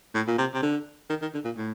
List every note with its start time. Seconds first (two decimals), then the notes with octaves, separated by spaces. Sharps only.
0.15 A2
0.27 A#2
0.38 C3
0.54 C3
0.62 D3
1.10 D#3
1.22 D#3
1.34 D3
1.45 A#2
1.57 A2